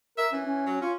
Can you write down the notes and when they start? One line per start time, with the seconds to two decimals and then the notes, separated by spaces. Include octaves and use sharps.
0.17 A#4 E5
0.32 E3 C#4
0.46 C#4
0.66 F#3
0.81 C#4 F4